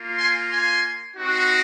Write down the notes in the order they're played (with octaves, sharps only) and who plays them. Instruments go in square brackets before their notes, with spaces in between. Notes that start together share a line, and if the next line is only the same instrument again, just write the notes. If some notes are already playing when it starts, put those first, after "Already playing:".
Already playing: [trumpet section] A#3 F4
G#5 C6
G#5 C6
C4 D#4 F#4